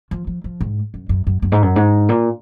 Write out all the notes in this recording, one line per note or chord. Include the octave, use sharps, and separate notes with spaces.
F3
F3
F3
G#2
F#2
F#2
F#2
F#2
G#2
F#2
G#2
A#2